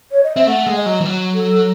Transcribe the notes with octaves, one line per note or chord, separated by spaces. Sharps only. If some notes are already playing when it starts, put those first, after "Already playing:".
C#5
D#5
C4 E5
A3 F#5
G#3
D#5
F#3
E3
F#3
A4